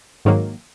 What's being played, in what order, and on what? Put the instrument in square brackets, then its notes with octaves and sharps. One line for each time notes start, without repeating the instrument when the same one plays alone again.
[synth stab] G#2 D#3 F#3 A#3